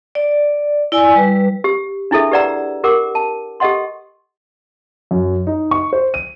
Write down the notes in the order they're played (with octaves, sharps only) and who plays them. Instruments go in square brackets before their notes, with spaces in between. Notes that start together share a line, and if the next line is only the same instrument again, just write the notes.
[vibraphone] D5
E4 D5 G#5 E6
G3 B4
[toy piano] G4
D4 E4 G#4 A4 E5
G4 B4 D5 F#5 A#5 E6
G4 A#4 F#5 D6
A5
G4 A4 D#5 F#5 C6
[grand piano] F#2
D#4
C#6
C5
D#7